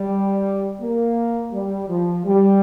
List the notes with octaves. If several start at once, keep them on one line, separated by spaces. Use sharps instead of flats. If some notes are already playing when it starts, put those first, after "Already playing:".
Already playing: G3
A#3
G3
F3
G3